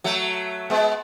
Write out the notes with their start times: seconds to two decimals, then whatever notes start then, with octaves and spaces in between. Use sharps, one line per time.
0.04 F#3 A3
0.70 G#3 B3